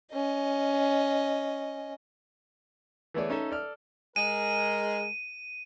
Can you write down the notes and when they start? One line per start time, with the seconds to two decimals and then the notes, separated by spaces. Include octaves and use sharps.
0.12 C#4 D#5
3.14 E3 A3 B3 G#4 C#5 D5
3.30 C#4 D#4 A4 E5
3.51 A4 D5 F6
4.16 G#3 A#4 D#7